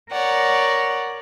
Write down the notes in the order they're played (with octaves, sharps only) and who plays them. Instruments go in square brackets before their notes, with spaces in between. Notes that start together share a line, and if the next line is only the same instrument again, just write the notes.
[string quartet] A#4 C#5 D5 F#5